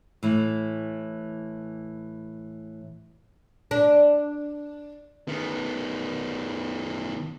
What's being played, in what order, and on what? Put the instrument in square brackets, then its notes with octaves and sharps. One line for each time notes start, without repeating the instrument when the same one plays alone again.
[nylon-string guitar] A2 E3
[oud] D4
[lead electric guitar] D#3 B3